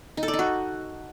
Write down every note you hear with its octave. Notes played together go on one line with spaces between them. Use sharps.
D#4
A4
D5
D#4
F#4